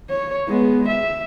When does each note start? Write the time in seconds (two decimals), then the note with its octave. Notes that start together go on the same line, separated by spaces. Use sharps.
0.10 C#5
0.48 G#3 B3
0.88 E5